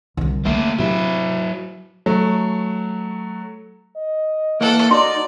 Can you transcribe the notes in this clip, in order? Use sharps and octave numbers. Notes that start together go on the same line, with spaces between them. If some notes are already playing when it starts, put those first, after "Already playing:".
C2 D3
D2 A3 A#3 E4
C3 F#3 E4
F#3 A3
D#5
E3 A#3 A4 F#5
D#4 F#4 D5 C6